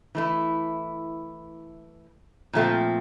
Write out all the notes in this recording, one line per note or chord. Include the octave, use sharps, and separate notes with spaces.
E3 A3 E4
A#2 F3 A3 C4